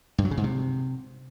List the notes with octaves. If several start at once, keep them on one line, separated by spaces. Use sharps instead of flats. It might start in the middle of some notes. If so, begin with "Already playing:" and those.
G2
F#3
C#3
G#2
C3